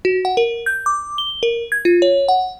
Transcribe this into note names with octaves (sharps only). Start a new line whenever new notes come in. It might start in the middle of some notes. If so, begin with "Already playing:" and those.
F#4
F#5
A#4
G6
D6
G7
A#4
G#6
F4
C#5
F#5